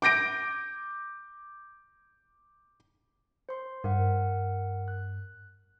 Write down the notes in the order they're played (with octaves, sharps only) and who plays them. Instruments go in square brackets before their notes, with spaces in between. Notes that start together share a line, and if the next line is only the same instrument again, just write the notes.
[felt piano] D6 G6 A#6 D7
[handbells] C5 C6
[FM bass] G2 [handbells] A#4 F#5
[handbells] F#6